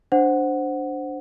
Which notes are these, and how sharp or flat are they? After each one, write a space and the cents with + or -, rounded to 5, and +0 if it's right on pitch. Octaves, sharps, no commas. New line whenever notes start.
D4 +0 C5 +0 F#5 +0